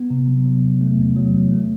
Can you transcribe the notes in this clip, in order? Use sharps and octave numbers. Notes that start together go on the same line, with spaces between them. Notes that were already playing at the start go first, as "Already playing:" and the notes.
Already playing: B3
C3
F#3
F#3
E2
A3
E2
F#3
E2
A3